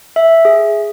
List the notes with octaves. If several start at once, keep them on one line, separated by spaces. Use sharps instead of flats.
E5
G#4